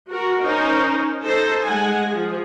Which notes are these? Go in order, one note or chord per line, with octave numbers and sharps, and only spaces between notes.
F#4 A#4
C#4 D#4 A#4 C5
D#4 A4 C5
G#3 F#5 G#5
F3 G#4